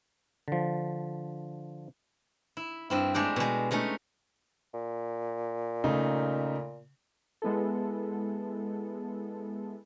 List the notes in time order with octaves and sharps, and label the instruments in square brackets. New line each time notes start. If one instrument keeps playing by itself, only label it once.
[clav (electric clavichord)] D3 F3
[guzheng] E4
G2 C4 E4
G#3 A3 D4 G5
B2 G#3
G#3 A3 C#4 D#4
[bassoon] A#2
[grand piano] C#3 A3 D#4
[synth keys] G#3 B3 E4 A4